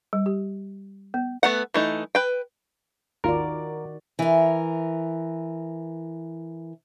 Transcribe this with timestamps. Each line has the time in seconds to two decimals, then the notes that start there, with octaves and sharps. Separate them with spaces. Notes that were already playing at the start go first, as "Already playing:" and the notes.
0.13 G3
0.26 G4
1.14 B3
1.43 A3 B3 F#5
1.74 E3 A3 D#4
2.15 B4 G5
3.24 G#1 D#2 D#3 F4 F#4 A#4 D5
4.19 E3 A#4